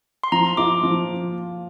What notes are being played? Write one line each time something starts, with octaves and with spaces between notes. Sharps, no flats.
C6
F3 A#5
F4 D6
F3